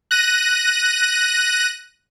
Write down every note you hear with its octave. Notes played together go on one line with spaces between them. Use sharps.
F#6 A#6 D#7